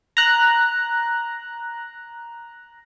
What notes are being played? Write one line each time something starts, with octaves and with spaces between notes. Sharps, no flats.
A#5 F#6